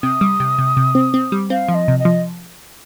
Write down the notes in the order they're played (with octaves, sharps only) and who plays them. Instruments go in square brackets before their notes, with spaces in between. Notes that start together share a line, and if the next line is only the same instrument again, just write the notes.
[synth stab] C3 [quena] D#6
[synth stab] G3
C3
C3
C3
C4
C4
G3
[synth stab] C4 [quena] F5
[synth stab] F3
[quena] D#5
[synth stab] C3
[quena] D#5
[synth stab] F3